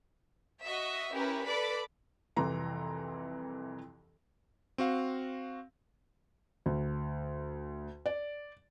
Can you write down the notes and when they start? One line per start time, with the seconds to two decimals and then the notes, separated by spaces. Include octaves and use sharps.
0.64 F#4 D#5 E5
1.12 C#4 E4 G4 A#4 B4
1.46 A4 B4 D5 B5 D6
2.36 C2 F2 C3 E3 A#5 C6
4.78 C4 F#4 F5
6.66 D2
8.06 D5